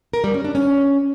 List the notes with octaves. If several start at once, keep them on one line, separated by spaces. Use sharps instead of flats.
A#4
G3
C#4
D4
C#4